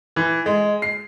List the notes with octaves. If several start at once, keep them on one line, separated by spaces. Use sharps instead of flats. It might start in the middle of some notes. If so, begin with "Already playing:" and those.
E3
G#3
C7